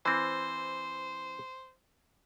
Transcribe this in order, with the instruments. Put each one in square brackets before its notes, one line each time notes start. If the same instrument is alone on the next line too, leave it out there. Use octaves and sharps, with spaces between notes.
[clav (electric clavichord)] E3 C4 [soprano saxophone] C5